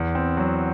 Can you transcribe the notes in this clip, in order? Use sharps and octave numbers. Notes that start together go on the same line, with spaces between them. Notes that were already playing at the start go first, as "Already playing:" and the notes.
Already playing: E2
C4
F#3